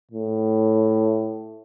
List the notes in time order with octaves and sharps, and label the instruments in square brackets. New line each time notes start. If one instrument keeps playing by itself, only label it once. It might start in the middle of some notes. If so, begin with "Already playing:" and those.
[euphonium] A2